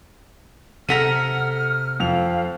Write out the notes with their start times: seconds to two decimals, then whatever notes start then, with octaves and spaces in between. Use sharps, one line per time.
0.89 C3 A4 F#5 A#5 F6 A#6 B6 D#7
2.00 F2 F5 F7